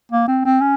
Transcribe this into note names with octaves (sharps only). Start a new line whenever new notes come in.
A#3
C4
C4
C#4